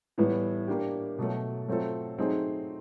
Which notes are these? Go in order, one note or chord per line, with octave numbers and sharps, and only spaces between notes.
A2 E3 G3 B3 E4
A#3 D4 G4
B2 F#3 A3
F#3 A3 C4 F4 A4
F#3 A3 C4 D#4 G#4